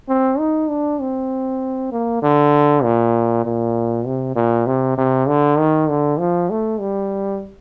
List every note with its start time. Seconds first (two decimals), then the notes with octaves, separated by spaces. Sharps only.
0.08 C4
0.39 D#4
0.69 D4
1.01 C4
1.92 A#3
2.22 D3
2.83 A#2
3.45 A#2
4.06 C3
4.36 A#2
4.67 C3
4.98 C3
5.28 D3
5.59 D#3
5.89 D3
6.19 F3
6.50 A3
6.80 G3